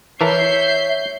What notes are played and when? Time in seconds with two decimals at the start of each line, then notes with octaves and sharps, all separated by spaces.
0.21 E3 A#4 C#5 E5 A5 G6 C7